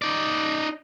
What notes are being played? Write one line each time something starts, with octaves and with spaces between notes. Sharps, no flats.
D#4 D5